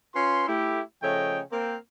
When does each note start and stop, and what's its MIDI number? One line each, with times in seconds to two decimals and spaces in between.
0.15 0.47 61
0.15 0.47 65
0.15 0.47 71
0.15 0.47 84
0.47 0.81 57
0.47 0.81 64
0.47 0.81 67
1.02 1.40 49
1.02 1.40 53
1.02 1.40 57
1.02 1.40 73
1.02 1.40 75
1.02 1.40 79
1.52 1.76 58
1.52 1.76 60